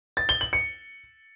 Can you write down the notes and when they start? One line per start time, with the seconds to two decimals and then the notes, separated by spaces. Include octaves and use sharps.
0.17 A6
0.29 G7
0.41 F#7
0.53 C#7